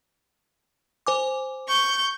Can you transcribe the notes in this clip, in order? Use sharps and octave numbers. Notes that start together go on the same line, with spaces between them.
C5 G#5 D6
C#6 G6